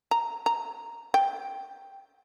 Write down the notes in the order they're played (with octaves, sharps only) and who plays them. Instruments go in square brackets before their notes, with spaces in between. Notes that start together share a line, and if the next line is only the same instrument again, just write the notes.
[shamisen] A#5
A#5
G5